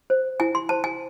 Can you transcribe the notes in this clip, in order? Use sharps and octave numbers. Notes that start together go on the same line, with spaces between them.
C5
E4 G#5
C6
C5 A5
G#5